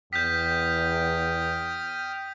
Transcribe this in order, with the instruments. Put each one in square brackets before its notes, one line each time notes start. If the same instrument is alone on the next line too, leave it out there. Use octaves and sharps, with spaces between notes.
[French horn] E2 [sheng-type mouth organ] G5 D#6 F6 [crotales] G6 B6